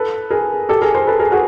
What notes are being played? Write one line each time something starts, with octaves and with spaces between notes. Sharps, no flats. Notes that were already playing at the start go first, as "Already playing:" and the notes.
Already playing: A4 B4
G#4 A#4
G4 A4
G#4 A#4
A#4 C5
A4 B4
G#4 A#4
F#4 G#4